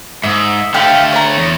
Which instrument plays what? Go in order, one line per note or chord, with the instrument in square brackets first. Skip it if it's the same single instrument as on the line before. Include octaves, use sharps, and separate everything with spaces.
[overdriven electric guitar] G#2 [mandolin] D#5 E5
[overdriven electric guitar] D3 A3 [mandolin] G4 F5
[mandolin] C#5 A#5
[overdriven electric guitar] E2